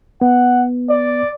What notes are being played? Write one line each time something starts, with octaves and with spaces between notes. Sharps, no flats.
B3 F#5
D5